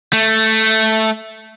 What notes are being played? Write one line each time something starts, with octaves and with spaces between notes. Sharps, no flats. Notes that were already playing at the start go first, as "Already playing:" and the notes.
A3